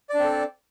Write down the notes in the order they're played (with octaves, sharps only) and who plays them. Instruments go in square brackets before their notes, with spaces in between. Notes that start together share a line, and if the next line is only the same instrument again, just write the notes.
[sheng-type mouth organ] D5
D4
C4
A4